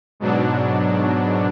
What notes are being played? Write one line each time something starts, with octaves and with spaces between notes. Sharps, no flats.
G#2 B2 F#3 D4